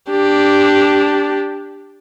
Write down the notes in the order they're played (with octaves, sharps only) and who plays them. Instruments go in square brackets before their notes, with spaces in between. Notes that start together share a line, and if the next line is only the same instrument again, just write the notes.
[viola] D4 G4